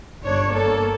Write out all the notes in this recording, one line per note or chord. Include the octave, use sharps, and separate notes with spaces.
G1 D4 C#5
A#3 A4